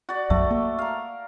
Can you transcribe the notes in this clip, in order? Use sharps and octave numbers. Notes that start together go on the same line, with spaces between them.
F#4 D5
B1 F#2 F#3 A3
A#3 A4
A#4 F5